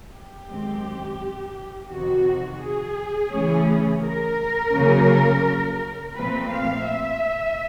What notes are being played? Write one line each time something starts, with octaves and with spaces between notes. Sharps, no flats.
G4
F#2 D#3 G#3 C4
F2 C3 D#3 F#4
G#4
C#3 E3 A3 C#4
A#4
F2 C#3 F#3 A#3 C#4
A#2 F3 A3 C4 B4
F5
E5